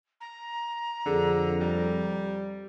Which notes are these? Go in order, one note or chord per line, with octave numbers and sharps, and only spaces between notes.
A#5
F2 D3 G#4
G3